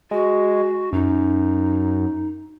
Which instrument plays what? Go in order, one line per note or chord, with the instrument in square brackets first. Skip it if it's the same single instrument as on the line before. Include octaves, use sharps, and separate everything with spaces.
[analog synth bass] G#3 [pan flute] F#4
[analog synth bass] F#2 [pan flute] D#4